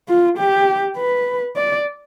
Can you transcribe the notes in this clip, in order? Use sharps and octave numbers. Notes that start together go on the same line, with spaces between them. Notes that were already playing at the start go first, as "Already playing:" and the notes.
F4
G4
B4
D5